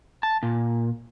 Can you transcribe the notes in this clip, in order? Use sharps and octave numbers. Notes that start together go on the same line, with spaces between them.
A5
A#2